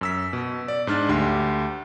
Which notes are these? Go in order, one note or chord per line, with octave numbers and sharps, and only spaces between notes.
F#2 E6 B6
B2
D5
G#2 D4 F6 A6
D2 G4 C6